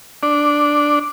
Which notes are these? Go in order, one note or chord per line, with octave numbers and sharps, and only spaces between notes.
D4